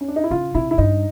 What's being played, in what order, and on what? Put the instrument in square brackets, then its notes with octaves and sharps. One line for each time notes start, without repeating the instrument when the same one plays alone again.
[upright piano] C#4
D4
D#4
E4
[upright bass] C#3 [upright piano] F4
[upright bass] C3 [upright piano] E4
[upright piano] E4
[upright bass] G2 [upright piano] D#4